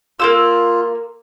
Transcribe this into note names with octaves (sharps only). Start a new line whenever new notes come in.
A#3 F4 G4 E6